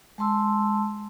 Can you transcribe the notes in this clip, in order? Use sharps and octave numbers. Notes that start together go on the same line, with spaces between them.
G#3 A5 C6 E6